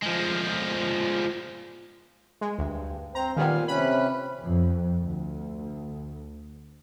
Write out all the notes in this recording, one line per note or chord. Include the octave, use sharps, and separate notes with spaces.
F3 G#3
G#3
D2 G2
C4 C5 A#5
A#2 D#3 G3 B3 F5 G#5
C3 C#4 B4 B5
F2
D2